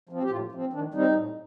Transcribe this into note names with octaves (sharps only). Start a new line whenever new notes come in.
F3 C4
G4
A2 F4
F3 C4
D#3 D4
G3 C4 D#4
A2